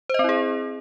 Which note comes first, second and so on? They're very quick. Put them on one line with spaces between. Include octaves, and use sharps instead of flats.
C5 D#5 C4 E4 G#4